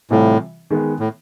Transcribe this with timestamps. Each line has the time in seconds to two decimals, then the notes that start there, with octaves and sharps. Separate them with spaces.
0.10 A2 C3 E3 G3 C4 F4
0.70 D#3 G#3 B3
1.00 A2